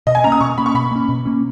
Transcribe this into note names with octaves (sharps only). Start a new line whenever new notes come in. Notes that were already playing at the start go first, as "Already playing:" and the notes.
B2 D#5
G#5
A#3 C#4 A#5
D#6
B2 C#6
A#3 C#4 B5
C#6
B2 B5
A#3 C#4
B2
A#3 C#4